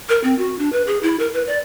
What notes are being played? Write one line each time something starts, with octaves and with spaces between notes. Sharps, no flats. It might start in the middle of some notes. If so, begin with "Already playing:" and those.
A#4
C4
F#4
D4
B4
G#4
E4
A#4
B4
D5